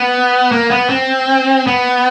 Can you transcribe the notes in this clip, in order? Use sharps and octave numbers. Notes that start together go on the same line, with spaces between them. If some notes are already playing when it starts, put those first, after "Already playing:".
Already playing: B3
A#3
B3
C4
B3